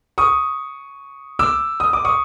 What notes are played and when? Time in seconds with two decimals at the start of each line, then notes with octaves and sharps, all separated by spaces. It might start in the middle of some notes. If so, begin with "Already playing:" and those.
0.18 C#6 D#6
1.39 D6 E6
1.80 D#6
1.93 D6
2.05 C#6 D#6